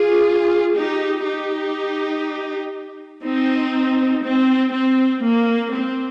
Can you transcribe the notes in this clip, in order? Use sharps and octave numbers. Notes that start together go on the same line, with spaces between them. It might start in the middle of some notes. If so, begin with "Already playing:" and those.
Already playing: F4 G#4
D#4 G4
D#4 G4
C4 D#4
C4
C4
A#3
C4